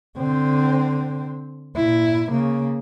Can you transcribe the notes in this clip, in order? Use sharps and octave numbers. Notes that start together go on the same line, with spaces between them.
D3 C4
A#2 E4
C#3 A#3